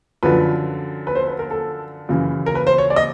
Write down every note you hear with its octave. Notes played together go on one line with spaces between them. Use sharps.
F#2 D3 F3 B4
B4
C5
B4
A#4
A4
F#2 C#3 E3
A#4
B4
C5
C#5
D5
D#5